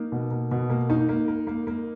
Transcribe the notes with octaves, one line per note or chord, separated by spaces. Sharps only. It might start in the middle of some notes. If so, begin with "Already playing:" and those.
Already playing: A#3 D#4
B2
A#3
B2
A#3
A#3 D#4
A#3
A#3
A#3
A#3